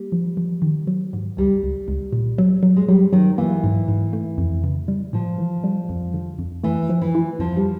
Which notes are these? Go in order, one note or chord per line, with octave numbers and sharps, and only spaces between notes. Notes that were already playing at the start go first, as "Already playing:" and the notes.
Already playing: G3 A#3
F3
F3
D#3
F#3
G#2
C#2 G3
C#2
C#2
A#2
F#3
F#3
G#3
F#3 G3
D#3 F#3
E3 A#3
G#2
G#2
A3
F2
C#3
G3
A2 F3
E3
G3
F2
D3
F2
E3 A3
F3
E3
E4
F2 F3
G3